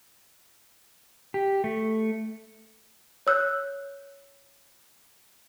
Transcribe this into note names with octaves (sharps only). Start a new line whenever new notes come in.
G4
A3
C#5 E6 F#6 G6